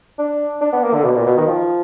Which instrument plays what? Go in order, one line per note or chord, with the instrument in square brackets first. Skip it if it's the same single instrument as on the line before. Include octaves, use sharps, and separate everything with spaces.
[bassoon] D4
D4
B3
A#3
D3
B2
A#2
B2
D#3
F3